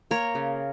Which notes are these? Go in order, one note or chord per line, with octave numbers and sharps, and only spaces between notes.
A#3 A#4 C#5
C#3